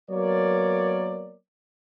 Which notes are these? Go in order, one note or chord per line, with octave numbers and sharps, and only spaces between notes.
F#3 A#3 B3 A#4 C#5 D5